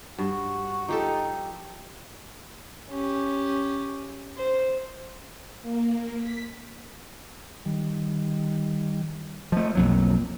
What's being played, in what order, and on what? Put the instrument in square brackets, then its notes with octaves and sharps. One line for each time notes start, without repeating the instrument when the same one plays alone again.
[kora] G2 [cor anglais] F#4
[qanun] F3 G4 A4 [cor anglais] D#4
[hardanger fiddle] C#4 G4
C5
[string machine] A#3
B6
[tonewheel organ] D#3 G3
[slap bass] F3 A3 [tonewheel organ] D#5
[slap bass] B1 F2 F#3 [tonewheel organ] A#3